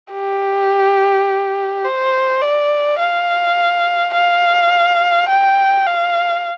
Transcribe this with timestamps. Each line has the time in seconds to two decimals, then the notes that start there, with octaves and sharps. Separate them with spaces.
0.12 G4
1.84 C5
2.41 D5
2.99 F5
4.14 F5
5.29 G5
5.87 F5